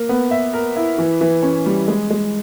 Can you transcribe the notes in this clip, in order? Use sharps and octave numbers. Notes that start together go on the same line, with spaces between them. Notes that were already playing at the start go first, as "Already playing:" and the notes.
Already playing: A#3
B3
E5
A#4
E4
E3
E3
C#4
G3
G#3
G#3